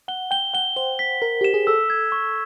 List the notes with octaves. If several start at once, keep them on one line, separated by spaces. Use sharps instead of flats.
F#5 G7
G5 G7
F#5 G7
C5 G7
B6
A#4 B6
G4 E7
G#4
A4 E6
G#6
C#6